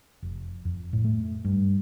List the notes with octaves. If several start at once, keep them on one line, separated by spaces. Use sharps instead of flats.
F1
F2
A2
A3
G2